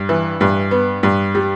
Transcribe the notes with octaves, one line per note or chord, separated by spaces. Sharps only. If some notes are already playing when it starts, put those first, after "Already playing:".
Already playing: G2
E3
G2
B3
G2
G3